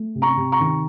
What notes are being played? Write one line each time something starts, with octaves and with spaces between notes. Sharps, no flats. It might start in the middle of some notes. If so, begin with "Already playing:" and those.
Already playing: A3
C3
A#5 C#6
C3
A#5 C#6
D#3